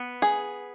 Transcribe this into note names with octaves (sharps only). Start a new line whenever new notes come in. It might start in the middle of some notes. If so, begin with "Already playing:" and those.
Already playing: B3
G#4